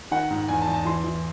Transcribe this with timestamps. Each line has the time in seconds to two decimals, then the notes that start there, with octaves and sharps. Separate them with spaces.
0.11 D#3 F#5
0.31 G#2
0.48 E2 G#5
0.62 A5
0.67 E2
0.74 A5
0.85 E3 C6
1.04 E3